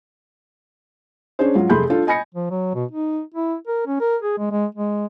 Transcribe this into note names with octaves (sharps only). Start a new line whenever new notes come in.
C#4 D4 G#4 C5
G#2 F#3 F4
F1 A3 G#4 B5 C6 G6
D4 F4 A4
D#5 G#5 B5 A#6 C#7
F3
F#3
B2
D#4
E4
A#4
C#4
A#4
G#4
G#3
G#3
G#3